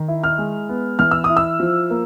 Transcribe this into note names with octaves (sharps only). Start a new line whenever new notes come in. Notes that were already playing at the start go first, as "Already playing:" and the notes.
Already playing: D#3
E4
F6
G#3
B3
E3 F6
E6
D#6
E4
E6
F3
A#3